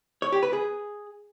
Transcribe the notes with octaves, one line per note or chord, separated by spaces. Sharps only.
C#5
G4
B4
G#4